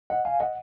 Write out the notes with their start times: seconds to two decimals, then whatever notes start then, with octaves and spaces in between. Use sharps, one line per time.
0.10 D#5 F#5
0.25 F5 G#5
0.40 D#5 F#5